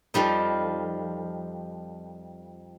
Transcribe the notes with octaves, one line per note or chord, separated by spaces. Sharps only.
F2 F3 G3 D#4